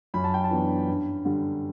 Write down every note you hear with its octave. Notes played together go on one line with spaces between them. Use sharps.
F#2 B5
A5
G5
A5
E3 B3 D4
G2
D3 G3